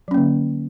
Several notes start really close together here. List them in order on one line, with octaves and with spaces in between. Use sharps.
F#3 C#4 A#3 D3